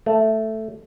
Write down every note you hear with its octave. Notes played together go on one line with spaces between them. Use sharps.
A3